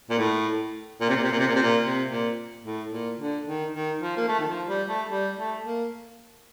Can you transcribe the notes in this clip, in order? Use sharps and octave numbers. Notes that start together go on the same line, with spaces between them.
A#2
A2
A#2
C3
A#2
C3
A#2
C3
A#2
C3
A#2
C3
A#2
A2
A#2
D3
D#3
D#3
F3
A#3
A3
D#3
F3
G3
A3
G3
A3
A#3